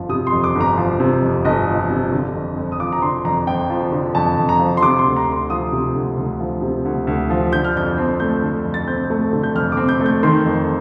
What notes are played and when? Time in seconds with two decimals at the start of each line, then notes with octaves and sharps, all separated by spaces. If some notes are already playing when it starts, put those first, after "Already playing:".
Already playing: G1 F2 F3
0.09 C3 D#6
0.27 C6
0.32 F2
0.44 D6
0.55 G1
0.61 A#5
0.78 F3
1.00 C3
1.22 F2
1.45 G1 D#5
1.67 F3
1.90 C3
2.12 D3
2.35 F2
2.57 F2
2.72 D#6
2.80 F3 D6
2.92 A#5
3.02 D3 C6
3.25 F2 A#5
3.47 F2 G5
3.70 F3
3.92 D3
4.15 F2 A5
4.37 F2
4.49 A#5
4.60 F3
4.77 C6
4.82 C3 D6
4.99 C6
5.04 D2
5.16 A#5
5.28 D2 C6
5.50 F3 D#6
5.72 C3
5.95 D2
6.17 D2
6.40 F3
6.62 C3
6.85 D2
7.07 D2
7.30 F3
7.52 D3 G6
7.65 F6
7.75 F2 G6
7.98 C4
8.20 A3 G6
8.42 D3
8.65 F2
8.74 A6
8.88 C4 G6
9.10 A3
9.33 D3
9.43 G6
9.55 F2 F6
9.72 D6
9.77 C4
9.89 G6
10.00 A3
10.06 G6
10.23 D#3 C6
10.46 F2